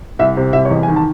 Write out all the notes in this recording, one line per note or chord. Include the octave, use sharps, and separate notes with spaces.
C2 E5
C3
C2 E5
C#5
E2 D#5
G#5
D#3
A5